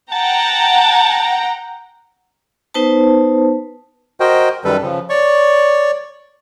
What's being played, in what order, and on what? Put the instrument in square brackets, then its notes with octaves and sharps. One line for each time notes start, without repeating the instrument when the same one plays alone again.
[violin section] F#5 G5 A#5 [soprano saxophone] A5
[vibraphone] B3 D#4 B4 C5 A5
[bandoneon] F#4 A#4 C5 D#5 G5
F#2 D#3 G3 A4 B4
C#3 F3
C#5 D5 C#6